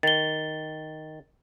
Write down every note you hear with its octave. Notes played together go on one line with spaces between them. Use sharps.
D#3 A6 G7